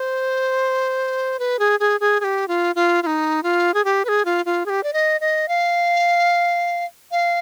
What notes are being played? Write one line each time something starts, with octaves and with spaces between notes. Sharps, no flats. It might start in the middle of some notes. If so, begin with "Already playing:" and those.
Already playing: C5
B4
G#4
G#4
G#4
G#4
G4
F4
F4
F4
D#4
F4
G#4
G4
B4
G#4
F4
F4
G#4
G4
D5
D#5
D#5
F5
F5